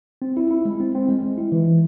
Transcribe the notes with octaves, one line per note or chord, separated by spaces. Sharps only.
C4
E4
E4
G#3
C4
C4
G#3
G#3
E4
E3
E4